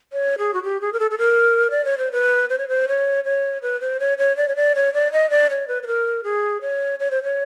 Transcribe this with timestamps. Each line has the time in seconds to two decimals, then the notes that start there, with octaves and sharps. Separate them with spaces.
0.13 C#5
0.38 G#4
0.54 F#4
0.63 G4
0.81 G#4
0.93 A#4
1.00 A4
1.11 A4
1.18 A#4
1.70 D5
1.85 C#5
1.98 C5
2.12 B4
2.49 C5
2.58 C#5
2.69 C5
2.88 C#5
3.24 C#5
3.62 B4
3.81 C5
4.00 C#5
4.18 C#5
4.37 D5
4.48 C#5
4.56 D5
4.75 C#5
4.94 D5
5.12 D#5
5.30 D5
5.50 C#5
5.68 B4
5.83 B4
5.87 A#4
6.24 G#4
6.61 C#5
7.00 C#5
7.11 C5
7.23 C#5